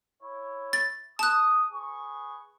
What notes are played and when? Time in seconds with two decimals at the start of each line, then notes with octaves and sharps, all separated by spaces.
0.23 E4 C#5
0.73 A6
1.19 A5 D#6 F#6
1.73 G#4 B4 C#6